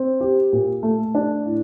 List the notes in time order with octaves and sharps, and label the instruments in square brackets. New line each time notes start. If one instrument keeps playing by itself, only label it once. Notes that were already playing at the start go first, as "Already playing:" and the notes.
Already playing: [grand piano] C4
G4
A#2
A3
D4
A2